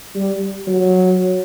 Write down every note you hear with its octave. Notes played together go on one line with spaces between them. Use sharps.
G3
F#3